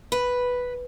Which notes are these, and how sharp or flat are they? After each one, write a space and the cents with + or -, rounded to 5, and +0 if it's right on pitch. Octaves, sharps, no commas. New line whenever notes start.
B4 +0